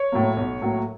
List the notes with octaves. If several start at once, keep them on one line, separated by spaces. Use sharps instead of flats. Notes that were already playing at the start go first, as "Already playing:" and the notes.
Already playing: C#5
A2 F#3 A#3
B1
A2 F#3 A#3